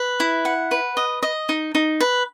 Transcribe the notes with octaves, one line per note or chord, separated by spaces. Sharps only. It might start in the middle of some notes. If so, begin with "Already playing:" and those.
Already playing: B4
E4
F#5
B4
D#5
D#5
D#4
D#4
B4